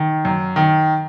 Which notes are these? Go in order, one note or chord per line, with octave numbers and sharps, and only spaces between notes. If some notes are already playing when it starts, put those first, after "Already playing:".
Already playing: D#3
F#2
D#3